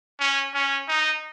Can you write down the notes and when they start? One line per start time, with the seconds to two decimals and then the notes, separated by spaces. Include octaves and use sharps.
0.20 C#4
0.54 C#4
0.88 D#4